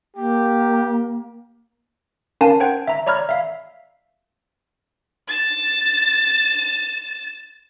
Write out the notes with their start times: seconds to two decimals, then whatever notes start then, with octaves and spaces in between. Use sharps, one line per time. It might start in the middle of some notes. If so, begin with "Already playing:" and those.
0.16 A#3 G4
2.41 C#4 A#4 F5 G#5 A5
2.60 C5 F#5 G5 G#6
2.87 E5 A#5
3.06 C#5 D5 A#5 B5 F6 G#6
3.29 E5 F5
5.28 A6 E7